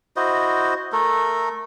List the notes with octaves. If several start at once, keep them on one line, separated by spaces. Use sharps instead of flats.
E4 F#4 C5 D#5
A3 A4 A#4